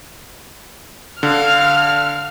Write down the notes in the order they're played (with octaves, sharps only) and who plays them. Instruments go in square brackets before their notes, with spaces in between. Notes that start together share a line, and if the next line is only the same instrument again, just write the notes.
[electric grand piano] D3 [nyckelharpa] F5 [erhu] F6